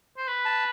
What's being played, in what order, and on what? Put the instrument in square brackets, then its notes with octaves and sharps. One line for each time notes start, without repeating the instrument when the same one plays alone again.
[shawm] C5
B4
[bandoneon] A5